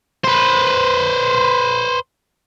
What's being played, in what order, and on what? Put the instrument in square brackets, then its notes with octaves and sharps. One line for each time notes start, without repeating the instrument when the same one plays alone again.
[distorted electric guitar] B4 C5